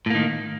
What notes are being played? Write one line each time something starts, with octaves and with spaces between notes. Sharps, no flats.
A2 D#3 A#3